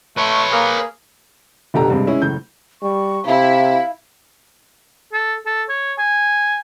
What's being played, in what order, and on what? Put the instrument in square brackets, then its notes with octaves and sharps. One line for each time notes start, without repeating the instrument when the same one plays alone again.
[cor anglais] A3 [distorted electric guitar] B4 C#5
[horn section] A#3 [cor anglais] G#4
[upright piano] F1 B2 D3 G4 A4 A#5
G2 C3 G#3
G#3 C#4 E4
F#1 A2 G6
[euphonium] G3 [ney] C#6
[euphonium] C3 [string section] E4 [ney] F5
[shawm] A4
A4
C#5
G#5